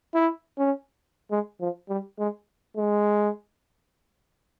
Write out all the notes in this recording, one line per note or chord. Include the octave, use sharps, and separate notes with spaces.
E4
C#4
G#3
F3
G3
G#3
G#3